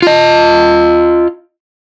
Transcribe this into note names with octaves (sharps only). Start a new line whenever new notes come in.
F4 D#5